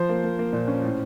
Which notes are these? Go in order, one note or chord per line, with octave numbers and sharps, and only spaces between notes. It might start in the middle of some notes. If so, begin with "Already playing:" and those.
Already playing: F3 C5
A#3
A#3
A#3
A#2
C#4
A2